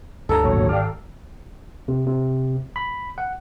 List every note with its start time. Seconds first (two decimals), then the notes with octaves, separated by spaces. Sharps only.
0.29 D2 G2 E4 A4 C#5 D#5 A#5
0.44 G#1 A#2 F#3 C#5
0.69 G4 D5 F5
1.88 C3
2.07 C3
2.76 B5
3.18 F#5